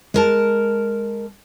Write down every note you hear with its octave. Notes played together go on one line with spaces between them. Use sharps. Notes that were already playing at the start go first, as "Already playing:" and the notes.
G#3 A#4 A5